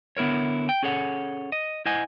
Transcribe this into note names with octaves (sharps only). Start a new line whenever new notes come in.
D3 B3 E4 A#4 C#5
G5
C#4 G#4 A4 C#5 F#5
D#5
E4 C5 D#5 F#5 G#5